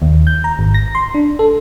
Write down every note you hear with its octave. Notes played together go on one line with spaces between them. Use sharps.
D#2
G6
A#5
G#1
A#6
C6
D4
A4